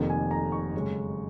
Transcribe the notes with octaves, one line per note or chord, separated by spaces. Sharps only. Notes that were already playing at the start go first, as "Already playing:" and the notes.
Already playing: F1 F2 D#3 A#3
G#5
A#5
C#6
F#2 C#3 G#3